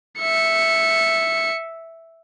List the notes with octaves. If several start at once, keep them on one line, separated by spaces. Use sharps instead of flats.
E5 C#7